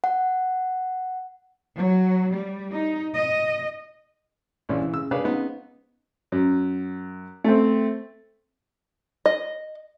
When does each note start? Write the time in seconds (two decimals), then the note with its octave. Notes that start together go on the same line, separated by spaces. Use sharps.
0.04 F#5
1.78 F#3
2.34 G3
2.74 D#4
3.16 D#5
4.69 A#1 E3 C#4 D5
4.81 E3
4.93 C#3 E6
5.11 D4 G#4 B4 C#5 D5 F5
5.24 C#3 B3 C4 D#4
6.32 F#2
7.44 A3 C4
9.26 D#5